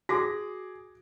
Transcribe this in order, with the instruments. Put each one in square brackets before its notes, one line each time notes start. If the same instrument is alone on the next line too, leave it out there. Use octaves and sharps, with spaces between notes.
[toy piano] F#4 [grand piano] G#4 [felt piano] D6 A#6